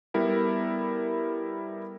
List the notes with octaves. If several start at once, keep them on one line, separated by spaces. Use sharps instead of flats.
G3 B3 E4 A4 A#4